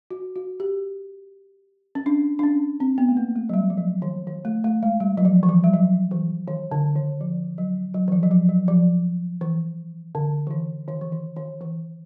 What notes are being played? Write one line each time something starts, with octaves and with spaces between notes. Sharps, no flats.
F#4
F#4
G4
C#4
D4
D4
C#4
C4
B3
A3
A#3
A3
F#3
G3
F3
F#3
D#3
D#3
A3
A3
G#3
G3
F#3
F3
E3
F3
G3
F#3
E3
D#3
D3
D#3
F3
F#3
F#3
E3
F3
F#3
F3
F#3
F3
E3
D3
E3
D#3
D#3
E3
D#3
D#3
E3